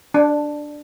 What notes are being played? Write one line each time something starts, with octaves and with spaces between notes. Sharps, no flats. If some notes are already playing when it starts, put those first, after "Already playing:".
D4